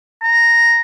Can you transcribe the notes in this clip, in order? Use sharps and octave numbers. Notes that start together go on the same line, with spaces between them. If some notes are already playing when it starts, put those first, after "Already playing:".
A#5